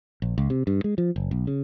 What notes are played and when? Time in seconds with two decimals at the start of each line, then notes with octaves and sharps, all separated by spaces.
0.22 A#1
0.38 C#2
0.50 C3
0.67 G2
0.84 G#3
0.98 F3
1.16 F#1
1.31 B1
1.47 C#3